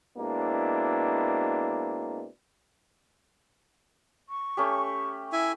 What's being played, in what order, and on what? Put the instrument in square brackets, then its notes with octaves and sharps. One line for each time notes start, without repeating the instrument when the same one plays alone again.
[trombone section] B2 G#3 A#3 C4 D4 E4
[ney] C#6
[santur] A3 C#4 G4
[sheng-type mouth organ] E4 E5 G#5